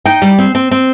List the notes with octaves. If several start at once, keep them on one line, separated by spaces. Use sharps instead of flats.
D#4 G5
G3
C4
C4
C4